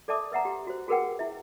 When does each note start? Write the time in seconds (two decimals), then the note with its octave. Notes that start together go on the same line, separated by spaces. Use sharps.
0.08 A4 D5 E5 A5 D6 D#6
0.32 B4 E5 F#5 A#5
0.45 G4
0.67 F#4 C5
0.88 F#4 G#4 A#4 B4 F#5 G5
1.19 E4 E5